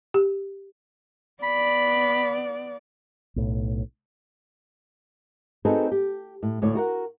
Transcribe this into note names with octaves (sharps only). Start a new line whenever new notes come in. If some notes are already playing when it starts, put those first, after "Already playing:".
G4
B3 D5 B5
B1 A2
C4 D#4 F#4 G#4 A4 B4
G4
A2
D2 A2 C#5 D5
F#4 A#4 F#5